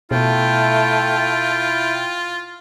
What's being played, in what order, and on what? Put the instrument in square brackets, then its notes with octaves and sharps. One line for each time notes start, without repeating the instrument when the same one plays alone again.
[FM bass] B2 [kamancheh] A3 [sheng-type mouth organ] E4 G5 [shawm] F4